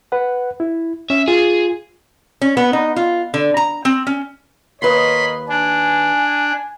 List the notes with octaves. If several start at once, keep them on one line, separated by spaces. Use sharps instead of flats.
B4 F#5
E4
C#4 E5
F4 G#4
C#4
B3
D#4
F4
D3
A#5
C4
C#4
D#2 A#4 B4 C#5 D#5 B5 C6
D4 G#5